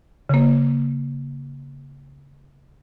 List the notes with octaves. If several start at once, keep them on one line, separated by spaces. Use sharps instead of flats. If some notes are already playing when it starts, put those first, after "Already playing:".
C#3 A#3